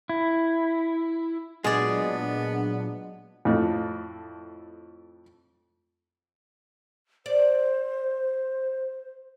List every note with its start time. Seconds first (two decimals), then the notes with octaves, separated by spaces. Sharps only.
0.09 E4
1.64 A#2 F#3 G#3 B3 D4 G#4 D5
3.45 F2 A2
7.26 C5 D5